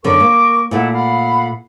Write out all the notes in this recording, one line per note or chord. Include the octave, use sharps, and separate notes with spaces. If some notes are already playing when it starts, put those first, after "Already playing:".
F#2 D3 B3 A#4 C#6 D6
A#3
A#2 A3 E4 F#5
F5 F#5 B5